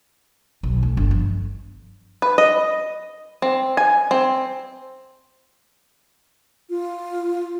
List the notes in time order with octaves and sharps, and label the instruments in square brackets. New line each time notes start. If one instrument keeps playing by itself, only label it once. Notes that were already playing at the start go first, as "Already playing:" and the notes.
[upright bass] B1
D2
G1
F3
[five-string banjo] B4
D#5
C4
G#5
C4
[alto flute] F4